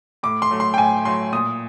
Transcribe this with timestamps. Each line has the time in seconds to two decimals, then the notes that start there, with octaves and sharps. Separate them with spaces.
0.23 A2 D6
0.42 C6
0.51 F#3 A3
0.60 C6
0.74 G5
0.78 A2 G#5
1.05 F#3 A3 C6
1.33 A#2 D#6